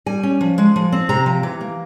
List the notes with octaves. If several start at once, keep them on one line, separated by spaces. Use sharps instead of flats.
G3 G#5
C#4
F3
G#3
F3
C4
C3 A#5
F3
E3
A#3